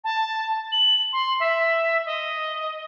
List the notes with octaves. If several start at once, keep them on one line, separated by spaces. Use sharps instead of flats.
A5
F#7
C6
E5
D#5